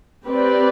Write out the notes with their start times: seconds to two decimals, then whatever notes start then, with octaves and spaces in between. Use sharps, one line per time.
0.25 C4 G4 B4 D5